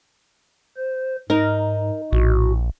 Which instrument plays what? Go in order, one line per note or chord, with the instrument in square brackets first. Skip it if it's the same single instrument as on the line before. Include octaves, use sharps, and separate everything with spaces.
[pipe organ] C5
[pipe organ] G#2 [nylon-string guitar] D#4 [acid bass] A#4
[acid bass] A#1 [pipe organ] A2 F#4